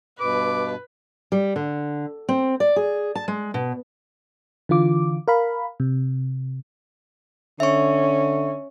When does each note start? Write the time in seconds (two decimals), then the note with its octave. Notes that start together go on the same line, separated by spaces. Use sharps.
0.20 G2 B2 B4 D6
1.32 G3
1.56 D3
2.29 C4
2.60 D5
2.76 G#4
3.15 A5
3.28 G#3
3.54 B2
4.69 D3 E3 F4 D6
5.28 A#4 F5 B5
5.80 C3
7.60 D3 C#4 E5 C#6